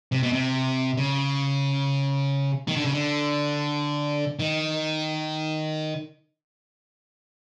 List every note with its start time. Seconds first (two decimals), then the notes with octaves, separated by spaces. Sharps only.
0.12 C3
0.23 B2
0.33 C3
0.97 C#3
2.68 D#3
2.76 D3
2.84 C#3
2.92 D3
4.39 D#3